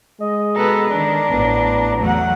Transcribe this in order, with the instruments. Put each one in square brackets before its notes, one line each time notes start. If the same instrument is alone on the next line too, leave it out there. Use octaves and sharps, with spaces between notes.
[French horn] G#3 [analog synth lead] D#5
[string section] B2 B3 [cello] A4 B4 [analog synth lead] A#5
[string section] D#3 [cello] D4
[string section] A1 A2 [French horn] B3
[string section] E2 F#5 [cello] F#3 A3